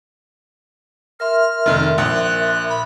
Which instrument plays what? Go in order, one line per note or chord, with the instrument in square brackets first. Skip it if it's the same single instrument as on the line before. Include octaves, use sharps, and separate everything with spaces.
[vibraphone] A#4 E5 C6 [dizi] F6
[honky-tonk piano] F1 D#3
[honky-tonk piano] A#1 [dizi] F#6
[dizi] B5